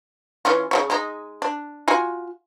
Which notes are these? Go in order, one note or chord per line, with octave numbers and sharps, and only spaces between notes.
E3 C#4 F4
C#3 G#3 C#5
G#3 D#4
D4
F4 F#4 G#5